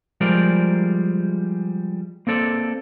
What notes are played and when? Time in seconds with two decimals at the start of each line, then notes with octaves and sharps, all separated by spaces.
0.21 F3 G3 G#3 A#4 C5 D5
2.27 A#3 C4 A4 D5